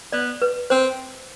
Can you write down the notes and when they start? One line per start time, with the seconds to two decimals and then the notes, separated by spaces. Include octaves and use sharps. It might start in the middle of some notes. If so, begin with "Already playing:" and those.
0.12 B3 D5
0.42 B4
0.70 C4 C5